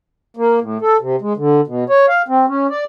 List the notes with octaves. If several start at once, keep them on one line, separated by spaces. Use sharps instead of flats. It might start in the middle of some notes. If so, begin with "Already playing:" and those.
A#3
A2
A4
C3
G#3
D3
B2
C#5
F5
C4
C#4
D5